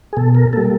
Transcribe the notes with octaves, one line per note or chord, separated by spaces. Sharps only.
G#4
B2 A4
A#4
G3 A#3 A4